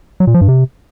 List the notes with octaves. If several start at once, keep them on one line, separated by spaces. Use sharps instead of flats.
F#3
A#2
F3
G2
C3